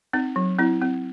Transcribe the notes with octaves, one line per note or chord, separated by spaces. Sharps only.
C4 D#4
F#3
C4 E4
C4